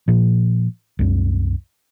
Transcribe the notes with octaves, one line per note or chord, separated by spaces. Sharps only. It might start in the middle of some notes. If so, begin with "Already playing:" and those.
A#2 F3
C2 F#2